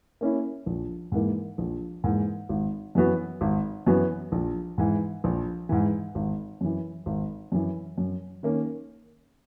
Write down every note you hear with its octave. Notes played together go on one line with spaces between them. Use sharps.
A#3 C#4 E4
A#1
G#2 E3 A#3
A#1
G#2 E3 A#3
G#1
F#2 E3 B3 F#4
G#1
F#2 E3 B3 F#4
A#1
G#2 E3
A#1
G#2 E3
G#1
F#2 E3
G#1
F#2 E3
F#2
D#3 A#3 C#4